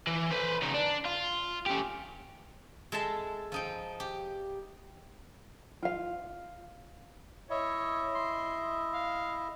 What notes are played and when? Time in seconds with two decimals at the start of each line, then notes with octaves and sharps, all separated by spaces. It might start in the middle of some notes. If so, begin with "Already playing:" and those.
0.07 E3
0.31 B4 C5
0.63 C#3 D#4
0.74 D4
1.06 F4
1.66 C#4 G4
2.92 G#3 A4 E5 A5 C6
3.52 F3 D#4 G5
4.00 G4
5.83 F4 F5
7.50 E4 C#5 D#5 E5
8.15 C6
8.93 F5